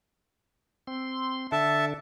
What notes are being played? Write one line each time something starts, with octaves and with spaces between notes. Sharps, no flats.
C4 C6
D3 D4 A4 E5 A5